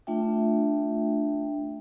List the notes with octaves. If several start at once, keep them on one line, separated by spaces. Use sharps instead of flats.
A3 D4 F4 E5 G5